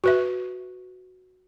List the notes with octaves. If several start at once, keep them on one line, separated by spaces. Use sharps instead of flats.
F#4 B4 E5